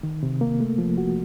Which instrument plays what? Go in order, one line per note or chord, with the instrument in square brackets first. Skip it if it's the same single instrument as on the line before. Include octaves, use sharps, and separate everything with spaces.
[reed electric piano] D#3
C3
A#3
A3
F3
F#4